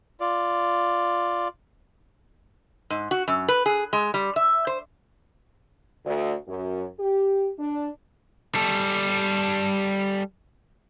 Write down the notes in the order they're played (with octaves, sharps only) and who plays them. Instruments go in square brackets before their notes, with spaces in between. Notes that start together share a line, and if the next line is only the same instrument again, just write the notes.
[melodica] F4 D5
[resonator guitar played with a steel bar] G#2
F#4
F#2
B4
G#4
G#3
G3
E5
C5
[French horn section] D2
F#2
G4
D4
[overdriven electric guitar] G3 A4